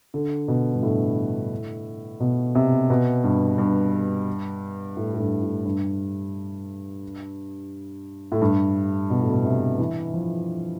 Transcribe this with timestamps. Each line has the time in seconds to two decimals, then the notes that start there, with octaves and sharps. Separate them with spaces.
0.14 D3
0.48 B2
0.74 G2
0.82 A2
2.20 B2
2.55 C3
2.90 B2
3.24 G2
3.58 G2
4.97 A2
5.14 A2
5.19 G2
5.43 A2
5.65 G2
8.32 A2
8.41 G2
9.10 B2
9.21 A2
9.30 B2
9.45 C3
9.79 E3
10.14 F3